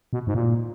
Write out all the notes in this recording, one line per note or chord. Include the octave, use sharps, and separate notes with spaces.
B2
G#2
A#2